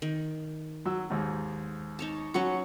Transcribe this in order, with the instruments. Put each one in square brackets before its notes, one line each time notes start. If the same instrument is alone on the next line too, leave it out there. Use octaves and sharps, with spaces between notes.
[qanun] D#3
[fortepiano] F#3 E6
D#2 G#2
[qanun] D#4 C#5 A5
[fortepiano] F#3 F#4 [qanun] C#4 B4 C#6